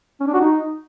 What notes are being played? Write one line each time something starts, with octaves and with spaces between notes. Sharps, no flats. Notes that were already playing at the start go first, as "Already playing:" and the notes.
C#4
D4
F#4
D#4